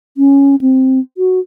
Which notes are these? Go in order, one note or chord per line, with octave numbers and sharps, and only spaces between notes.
C#4
C4
F#4